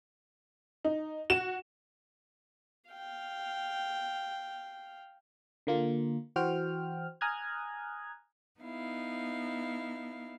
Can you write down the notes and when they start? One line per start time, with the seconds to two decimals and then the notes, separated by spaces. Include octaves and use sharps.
0.85 D#4
1.30 F#4 E7
2.90 F5 G5
5.67 D3 A#3 F4
6.36 E3 F#4 C5 G5 F6
7.21 G#5 A#5 D#6 F6 F#6 G#6
8.60 B3 D#4 E4 F5